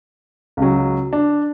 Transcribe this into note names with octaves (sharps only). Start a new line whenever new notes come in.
C#2 C#3 F#3
D4